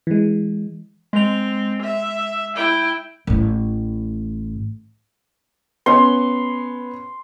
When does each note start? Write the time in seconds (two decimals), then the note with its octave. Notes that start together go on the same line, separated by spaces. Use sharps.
0.07 E3 G#3
1.13 G#3 C4 F7
1.82 E5
2.56 E4 G5
3.27 A1 A2
5.86 B3 C#4 C6